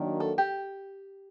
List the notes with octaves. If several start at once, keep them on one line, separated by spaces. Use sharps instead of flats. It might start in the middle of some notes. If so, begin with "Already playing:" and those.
Already playing: D#3 F#3 A#3 D4 F#4
A4
G4